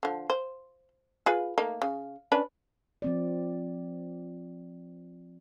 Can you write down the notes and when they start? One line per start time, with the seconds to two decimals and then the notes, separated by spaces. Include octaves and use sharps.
0.03 D3 F3
0.30 C5
1.26 F4 G#4 B4
1.58 A3 A#3 D#4
1.82 C#3
2.32 C#4 D4 B4
3.02 F3 C4 D5